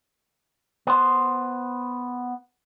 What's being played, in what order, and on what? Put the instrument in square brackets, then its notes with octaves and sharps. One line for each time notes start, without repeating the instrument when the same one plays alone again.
[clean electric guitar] B3 C5 C6